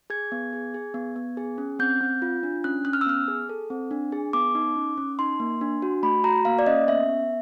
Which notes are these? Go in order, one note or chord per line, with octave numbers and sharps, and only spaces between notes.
G#4 G#6
B3
G#4
G#4
B3
B3
G#4
C#4
C4 G6
C4
F4
D4
C#4 F#6
C#4 F#6
F6
E6
B3 F6
G#4
A4
C4
D4
G#4
B3 D6
D#4
C#4
C#4
D#4 C6
A#3
D4
F#4
A3 B5
F#4 A#5
A#3 F5
D5
C#4 D#5
B3 E5
B3